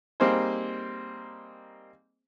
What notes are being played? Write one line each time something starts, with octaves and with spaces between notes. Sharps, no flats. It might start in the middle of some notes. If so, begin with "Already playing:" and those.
G3 A#3 C4 D#4 G#4 C5